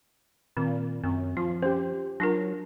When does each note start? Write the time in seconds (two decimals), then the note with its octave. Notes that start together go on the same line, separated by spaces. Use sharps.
0.57 A#2 D#3 C4
1.04 F#2 C4
1.37 F3 F4
1.63 C#4 G4 C5
2.20 F#3 D4 F4 A#4